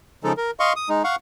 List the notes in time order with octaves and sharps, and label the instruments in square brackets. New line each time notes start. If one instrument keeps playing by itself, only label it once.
[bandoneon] C#3 F3 G#3 D#4 A4
A#4
D#5 F5 C6 C#6
D#6
G#3 D#4
F5 F#5 C#6